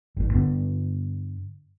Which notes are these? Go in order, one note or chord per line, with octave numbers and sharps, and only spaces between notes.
G#1 A2
G2 D3 B3